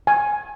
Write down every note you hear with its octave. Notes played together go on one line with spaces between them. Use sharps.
G#5